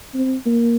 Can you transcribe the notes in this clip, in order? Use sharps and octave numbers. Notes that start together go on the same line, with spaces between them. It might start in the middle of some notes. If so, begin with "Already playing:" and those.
C4
A#3